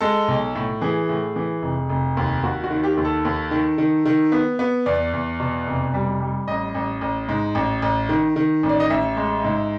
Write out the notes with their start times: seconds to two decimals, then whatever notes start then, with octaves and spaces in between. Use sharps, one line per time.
0.01 G#3 A4
0.28 B1
0.55 A2
0.81 E3 G#4
1.09 A2
1.36 E3
1.62 F1
1.89 F1
2.17 D#2
2.43 D#2 F#4
2.64 F#4
2.70 D#3
2.83 G4
2.97 D#2
3.05 A4
3.25 D#2
3.51 D#3
3.78 D#3
4.06 D#3
4.32 B3
4.59 B3
4.86 E2 D5
5.13 E2
5.40 B2
5.67 F1
5.94 G3
6.21 G3
6.48 A1 D#5
6.75 A1
7.01 A1
7.29 G#2
7.55 A1
7.82 A1
8.09 D#3
8.36 D#3
8.63 A1
8.69 D5
8.80 D#5
8.90 A1 E5
9.17 G#3
9.44 G#2